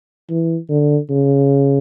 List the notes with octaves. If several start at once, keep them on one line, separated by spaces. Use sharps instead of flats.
E3
D3
C#3